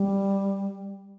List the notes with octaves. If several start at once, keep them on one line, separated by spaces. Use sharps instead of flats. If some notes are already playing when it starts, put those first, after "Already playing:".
Already playing: G3